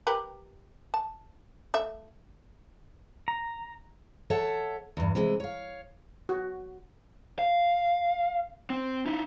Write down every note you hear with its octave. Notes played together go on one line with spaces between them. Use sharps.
G4 A#4 B4
A5
A3 E5
A#5
A4 C#5 E5 F#5 A5
E2 G2
C3 E3 G#3
C#5 F5
F#4
F5
C4
D#4 E4